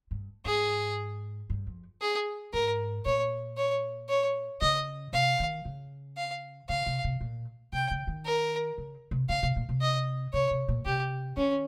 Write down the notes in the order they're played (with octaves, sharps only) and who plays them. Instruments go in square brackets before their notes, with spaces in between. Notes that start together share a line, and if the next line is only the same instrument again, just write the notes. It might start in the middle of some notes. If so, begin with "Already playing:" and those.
[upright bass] G2
[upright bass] G#2 [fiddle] G#4
[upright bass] G2
F2
[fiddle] G#4
[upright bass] G#2 [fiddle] A#4
[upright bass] A#2 [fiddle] C#5
[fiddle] C#5
C#5
[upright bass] C#3 [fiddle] D#5
[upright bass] C3 [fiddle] F5
[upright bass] D#3
C#3
[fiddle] F5
[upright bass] C#3 [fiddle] F5
[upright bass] C3
C3
A#2
[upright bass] C3 [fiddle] G5
[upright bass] C#3
D#3
[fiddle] A#4
[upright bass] C#3
C3
[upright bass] C#3 [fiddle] F5
[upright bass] C3
A#2
C3
[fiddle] D#5
[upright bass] C3 [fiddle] C#5
[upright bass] C3
A#2
[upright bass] C3 [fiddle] G4
[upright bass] D#3 [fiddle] C#4